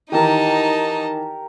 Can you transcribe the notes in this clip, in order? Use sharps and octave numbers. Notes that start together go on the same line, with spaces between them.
D#3 E3 D#4 G4 A#4 D#5 A5